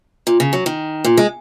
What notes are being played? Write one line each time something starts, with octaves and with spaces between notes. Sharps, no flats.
A#2
C#3
F#3
D#3
A#2
G#3